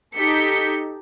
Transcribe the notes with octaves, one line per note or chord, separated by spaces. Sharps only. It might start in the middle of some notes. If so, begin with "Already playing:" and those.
D#4 G4 A4 G6 B6 C#7